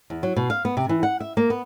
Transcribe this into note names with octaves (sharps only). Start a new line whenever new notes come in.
E2
F#3
B2
F5
B3
C3
E3
F#5
E5
A#3
B3